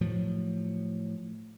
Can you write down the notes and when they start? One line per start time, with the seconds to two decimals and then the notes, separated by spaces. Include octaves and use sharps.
0.01 A2 F3 F#3